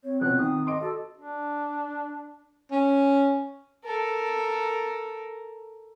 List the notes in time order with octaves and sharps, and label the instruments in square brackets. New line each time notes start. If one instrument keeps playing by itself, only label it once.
[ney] C4 [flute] C#5
[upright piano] B2 F3 C#4 [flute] F#6
[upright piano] D#3 [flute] D#6
[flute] D#5 [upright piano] C6 D6 D7
[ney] F#4 [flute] A4
[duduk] D4
[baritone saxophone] C#4
[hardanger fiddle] A4 A#4